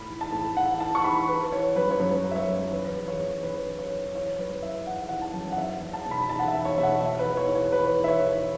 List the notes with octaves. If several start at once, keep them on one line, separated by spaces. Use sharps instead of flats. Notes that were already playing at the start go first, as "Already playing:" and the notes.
Already playing: A2 B5
E3
A5
A2
E3 F#5
E3 A5
C#6
E3 B5
E3 B4
E3 C#5
F#2 B4
C#5
F#2 B4
F#2
E5
C#5
F#2
E2 B4
E2
C#5
E2
E2 B4
E2
C#5
E2
E3 C#5
F#2 B4
E3 E5
E3 F#5
E5
E3 F#5
A5
F#2
F#5
E2 E5
E2
A5
B2
B5
E2 A5
F#5
E5
E2
C#5
B2 E5
F#5
E2 E5
B4
E2
C#5
E3
C#5
E2 B4
E3
E5
C#5
E3